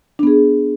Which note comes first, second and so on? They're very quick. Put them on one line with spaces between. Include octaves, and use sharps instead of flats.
D4 B3 G#4